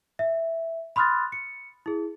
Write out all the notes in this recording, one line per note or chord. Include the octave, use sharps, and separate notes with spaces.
E5
B5 C6 D#6 F6 F#6 A6
C#7
E4 G#4